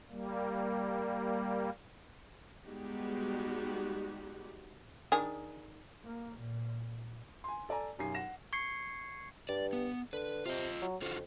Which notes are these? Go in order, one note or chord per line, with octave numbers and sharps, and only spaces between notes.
G3 A#3
G3 G#3 B3 D#4 F#4 G4
D#3 D4 G#4
A#3
A#2
G#5 C6
A4 D5 G#5 A#5
B1 F#2 G4 G#5 C7
F#5 A#6 E7
C#6 G#6 C7 C#7
G2 D5
B3
D3 B4
C3 F4 D#5
F#3
F2 D3 F4 F#4